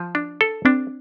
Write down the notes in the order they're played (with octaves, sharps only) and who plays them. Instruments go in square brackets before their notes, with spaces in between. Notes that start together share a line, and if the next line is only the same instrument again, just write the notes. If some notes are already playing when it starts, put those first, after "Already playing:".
Already playing: [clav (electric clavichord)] F3
D4
A4
[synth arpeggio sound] C4 [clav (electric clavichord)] D4